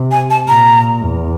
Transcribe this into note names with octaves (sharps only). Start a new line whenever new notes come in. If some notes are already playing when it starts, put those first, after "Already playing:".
Already playing: C3
G#5
A5
A#2 A#5
E2